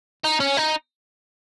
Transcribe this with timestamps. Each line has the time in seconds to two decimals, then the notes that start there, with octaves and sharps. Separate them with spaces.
0.24 D#4
0.40 C#4
0.57 D#4